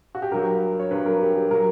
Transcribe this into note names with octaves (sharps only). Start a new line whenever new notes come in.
F#4
G4
G2 F#3 A#4
C#5
G2 F#3 B4
A#4
G4
G4
F#3 A#4